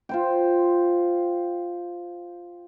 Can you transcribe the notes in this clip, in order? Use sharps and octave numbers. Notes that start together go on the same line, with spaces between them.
F4 C5 G5